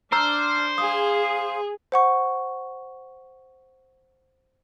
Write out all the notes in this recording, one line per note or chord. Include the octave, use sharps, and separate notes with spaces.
D4 C5 A#5 E6 F6
G#4 F5 D#6
C5 F#5 C#6